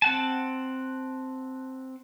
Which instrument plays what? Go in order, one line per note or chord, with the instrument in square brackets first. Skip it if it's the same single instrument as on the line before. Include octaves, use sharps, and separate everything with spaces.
[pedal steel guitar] C4 F#5 A5